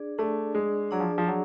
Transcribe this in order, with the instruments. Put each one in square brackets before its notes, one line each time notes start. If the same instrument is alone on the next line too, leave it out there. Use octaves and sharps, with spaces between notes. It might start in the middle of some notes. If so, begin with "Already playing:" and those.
Already playing: [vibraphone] D4 G#4 D5
[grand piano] A3 [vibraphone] D4 G#4 D5
[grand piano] G#3
[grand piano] F#3 [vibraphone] D4 G#4 D5
[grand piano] F3
F3
F#3